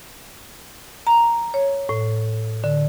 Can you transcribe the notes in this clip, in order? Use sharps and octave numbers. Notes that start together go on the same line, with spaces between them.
A#5
C#5
A2
D3